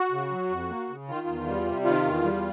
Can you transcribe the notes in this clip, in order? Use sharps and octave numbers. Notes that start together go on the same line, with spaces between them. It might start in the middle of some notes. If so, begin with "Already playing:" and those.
Already playing: F#4
C#3
F#3
F2
A#3
C#3
D#3 F4
E2
G3
C3
D#3 F4
E2
G3